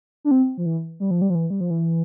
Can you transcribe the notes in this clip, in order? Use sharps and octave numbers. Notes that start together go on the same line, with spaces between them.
D4
C4
F3
E3
G3
F3
G3
F3
E3
G3
F3
E3